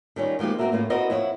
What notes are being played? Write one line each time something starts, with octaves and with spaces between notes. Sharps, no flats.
D#3 G3 C#4 F4
D#3 F3 G#3 A#3 G4
A#3 C4 E4 F#4 A#4 E5
A2 A#3 C#4 F4
C4 E4 F#4 A#4 B4 D#5
F2 E4 C#5 F#5